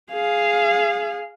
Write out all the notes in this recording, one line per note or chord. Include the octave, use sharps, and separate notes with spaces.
G#4 F5